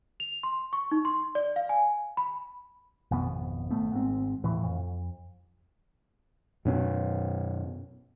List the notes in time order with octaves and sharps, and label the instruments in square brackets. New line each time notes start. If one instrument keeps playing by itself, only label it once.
[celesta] F7
C6
C#6
D#4
C6
D5
F5
G#5
B5
[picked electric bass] G#1 F2 B2 B3
G#1 A3 B3
G#1 G#2 C4
D#1 A2 E3
F2
[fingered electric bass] F#2 B2 C#4